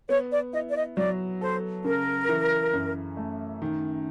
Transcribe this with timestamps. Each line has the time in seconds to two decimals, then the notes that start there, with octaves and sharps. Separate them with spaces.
0.09 B3 C#5
0.31 D5
0.53 E4 D#5
0.69 D5
0.76 D#5
0.97 F#3 D5
1.41 A4 C5
1.85 C#3 A#4
2.29 E3
2.73 F#2
3.17 A3
3.62 D#3